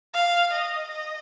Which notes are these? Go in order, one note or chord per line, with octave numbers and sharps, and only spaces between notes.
F5
D#5
D#5